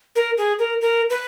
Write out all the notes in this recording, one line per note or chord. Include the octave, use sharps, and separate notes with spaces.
A#4
G#4
A#4
A#4
B4